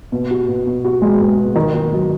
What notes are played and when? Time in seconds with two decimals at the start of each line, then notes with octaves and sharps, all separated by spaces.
0.12 B2
0.31 F#4
0.48 B2
0.66 B2
0.85 F#4
1.02 G#3
1.20 B2
1.38 B2
1.55 D#3
1.74 D#3
1.92 F#3